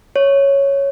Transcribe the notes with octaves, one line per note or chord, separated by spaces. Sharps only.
C#5